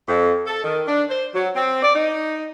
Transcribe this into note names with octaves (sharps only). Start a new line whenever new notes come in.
F2
A4
D#3
D4
C5
F#3
C4
D5
D#4